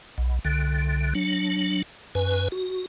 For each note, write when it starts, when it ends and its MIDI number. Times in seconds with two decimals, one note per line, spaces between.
0.18 0.39 35
0.45 1.14 36
0.45 1.14 50
1.15 1.82 54
1.15 1.82 62
2.15 2.48 42
2.15 2.48 71
2.15 2.48 80
2.52 2.86 66